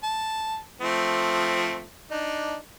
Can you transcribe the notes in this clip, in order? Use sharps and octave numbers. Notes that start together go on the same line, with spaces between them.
A5
F3 A3 C4
D4 D#4